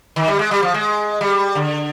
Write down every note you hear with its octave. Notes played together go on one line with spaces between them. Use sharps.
D#3
G3
G#3
G3
F3
G#3
G3
D3